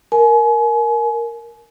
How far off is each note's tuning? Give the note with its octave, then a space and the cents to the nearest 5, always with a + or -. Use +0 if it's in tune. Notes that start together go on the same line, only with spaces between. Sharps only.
A#4 +0 G#5 +35